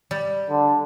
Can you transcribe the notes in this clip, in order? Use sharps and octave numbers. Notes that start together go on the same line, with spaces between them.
G3
D3